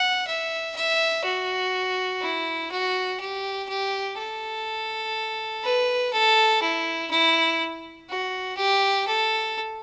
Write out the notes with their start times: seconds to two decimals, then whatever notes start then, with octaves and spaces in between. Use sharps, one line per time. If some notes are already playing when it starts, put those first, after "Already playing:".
Already playing: F#5
0.27 E5
0.76 E5
1.25 F#4
2.22 E4
2.71 F#4
3.21 G4
3.69 G4
4.18 A4
5.64 B4
6.13 A4
6.62 E4
7.11 E4
8.09 F#4
8.57 G4
9.07 A4